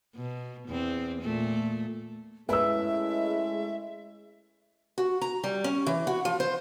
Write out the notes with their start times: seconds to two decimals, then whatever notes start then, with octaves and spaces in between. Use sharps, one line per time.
0.15 B2
0.68 E2 C4
1.22 A#2 A3
2.49 G#3 A3 C#4 E4 B4 E5 E6
4.98 F#4
5.21 A#5
5.44 G3
5.64 C#4
5.87 E3
6.07 F#4
6.25 F3
6.40 C5